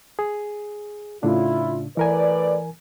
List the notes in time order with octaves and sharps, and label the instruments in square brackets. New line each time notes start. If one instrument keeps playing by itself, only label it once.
[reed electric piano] G#4
[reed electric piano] A2 C#3 D4 [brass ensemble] E4 F4
[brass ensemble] A2 B4 D5 [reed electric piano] E3 A#4 G#5